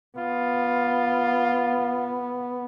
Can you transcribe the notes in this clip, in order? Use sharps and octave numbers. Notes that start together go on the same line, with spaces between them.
B3 F4